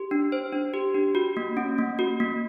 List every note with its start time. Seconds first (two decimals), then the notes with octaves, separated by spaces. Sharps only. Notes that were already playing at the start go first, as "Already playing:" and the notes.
Already playing: G4
0.11 D4
0.32 C5
0.53 D4
0.74 G4
0.95 D4
1.15 F#4
1.37 A#3
1.57 C#4
1.78 A#3
1.99 F#4
2.20 A#3